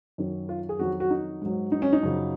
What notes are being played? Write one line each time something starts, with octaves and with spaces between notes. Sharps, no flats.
F#2 D#3 F#3
F4
G#4
F2 D#3 F#3 F#4
F#4
D#4
G#2 F#3
D#4
C#4
D#4
F#2 C#3 F3